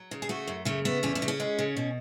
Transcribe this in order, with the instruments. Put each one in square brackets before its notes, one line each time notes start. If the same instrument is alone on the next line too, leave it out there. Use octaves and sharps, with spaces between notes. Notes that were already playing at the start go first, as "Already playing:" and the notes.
Already playing: [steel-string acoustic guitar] F#3
C#3
G#4
A3 F#4
F#2
C#3 A3
A3 B3
E2 C#4
C#4
C#3
C#4
G#3
C#3
B2